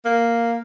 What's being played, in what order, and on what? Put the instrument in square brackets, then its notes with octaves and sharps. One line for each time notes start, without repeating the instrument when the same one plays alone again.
[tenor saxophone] A#3